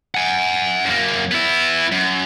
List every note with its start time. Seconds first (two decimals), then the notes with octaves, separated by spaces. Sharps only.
0.15 F#5 G#5
0.85 F#2 A#3
1.31 B3 E4
1.92 F#2